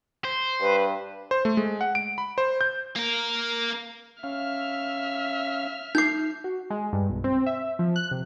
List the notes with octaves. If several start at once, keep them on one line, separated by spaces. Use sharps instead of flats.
C5
G2 B4
C5
A3
G#3
F#5
D7
B5
C5
G6
A#3 A#4
C#4 E5 F5 F6
D#4 D6 G6 C7
F#4
G#3
G2
B1
C4
E5
F3
F#6
C3